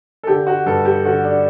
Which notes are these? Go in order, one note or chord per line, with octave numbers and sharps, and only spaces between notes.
A4
D3 G4
F#4
G2 A4
G4
D3 F#4
D4